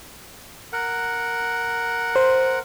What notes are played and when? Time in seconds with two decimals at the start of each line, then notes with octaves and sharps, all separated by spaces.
0.73 A#4 F#5
2.16 C5